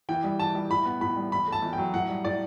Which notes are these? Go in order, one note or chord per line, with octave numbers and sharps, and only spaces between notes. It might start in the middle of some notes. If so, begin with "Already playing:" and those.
E3 G5
G3
E3 A5
G3
A2 B5
B3
A2 B5
G3
E2 B5
A3 A5
E2
G5
F#3
A2 F#5
G3
A2 D5